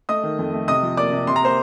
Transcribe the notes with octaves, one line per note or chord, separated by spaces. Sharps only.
A3 D#5 D#6
D#3
F2
A3
C3 D#5 D#6
F3
A#3 D5 D6
C3
C3 C6
A#5
A#3 C5 C6